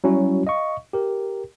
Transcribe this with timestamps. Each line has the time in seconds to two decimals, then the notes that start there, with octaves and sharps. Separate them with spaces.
0.04 F#3 G3 C#4 E4 F#4
0.47 D#5 F5 C#6
0.93 G4 A#4